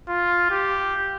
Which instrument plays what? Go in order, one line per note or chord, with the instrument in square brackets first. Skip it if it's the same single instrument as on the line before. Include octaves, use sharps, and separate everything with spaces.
[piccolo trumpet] F4
G4